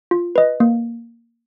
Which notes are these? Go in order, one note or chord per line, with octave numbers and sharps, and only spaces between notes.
F4
B4 D#5
A#3